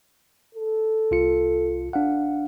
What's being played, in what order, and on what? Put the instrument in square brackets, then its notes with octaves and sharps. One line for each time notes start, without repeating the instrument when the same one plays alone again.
[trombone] A4
[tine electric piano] C2 F4 C#7
D4 F5 F#5